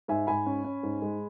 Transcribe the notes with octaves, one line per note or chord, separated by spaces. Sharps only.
G#2 E5 G#5
G#2 G#5 B5
C#4
C#4
G#2
G#3